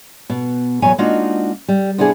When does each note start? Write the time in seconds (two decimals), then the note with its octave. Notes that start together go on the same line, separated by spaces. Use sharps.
0.30 B2
0.82 E2 B2 F#3 B4 C#5 G#5
0.98 G#3 A#3 D4 D#4 F4 F#4
1.68 G3
1.98 C3 B3 D4 E4 G#4